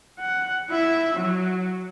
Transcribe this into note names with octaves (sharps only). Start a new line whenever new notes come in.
F#5
E4 E5
F#3